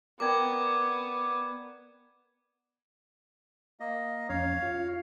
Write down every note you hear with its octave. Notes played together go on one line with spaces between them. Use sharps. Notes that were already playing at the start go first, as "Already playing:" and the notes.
B3 A#4 D5 G5 D6 G#6
A#3 D#5
F2 C#4 C#5 F5
F4